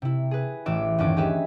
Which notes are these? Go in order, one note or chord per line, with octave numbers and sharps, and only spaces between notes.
C3 E4
G#4 B4
A1 E3 E5 D6 E7
G1 D#2 C#4 D6
D#4 G4 G#4 B4 E5